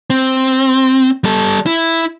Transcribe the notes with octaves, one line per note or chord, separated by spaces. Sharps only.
C4
G3 A4
E4